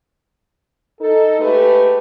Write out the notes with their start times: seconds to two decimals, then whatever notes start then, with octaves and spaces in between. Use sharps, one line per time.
1.00 D#4 A4
1.40 G#3 A3 G4 B4